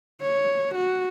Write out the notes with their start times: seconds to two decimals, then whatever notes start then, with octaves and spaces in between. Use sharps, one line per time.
0.21 C#5
0.75 F#4